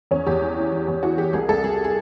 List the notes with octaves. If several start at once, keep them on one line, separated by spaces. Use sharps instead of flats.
E2 C#4
E2 G4
E3
E3
E3
E2
E3 F#4
E3 G4
C2 G#4
C2 A4
C2 G#4
G#4